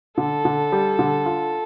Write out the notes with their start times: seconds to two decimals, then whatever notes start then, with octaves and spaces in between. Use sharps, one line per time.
0.18 D3 A4
0.45 D3
0.72 G3
0.99 D3
1.26 F4